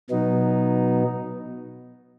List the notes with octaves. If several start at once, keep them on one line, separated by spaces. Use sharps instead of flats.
B2 F#3 B3 D#4